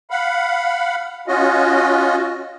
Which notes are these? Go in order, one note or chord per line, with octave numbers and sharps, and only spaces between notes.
F5 F#5 B5
C#4 F4 F#4 D#5